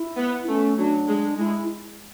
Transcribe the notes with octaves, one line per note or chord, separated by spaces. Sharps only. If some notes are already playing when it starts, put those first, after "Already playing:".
Already playing: E4
B3
A3 C#4
F#3 D4
G#3
G#3 E4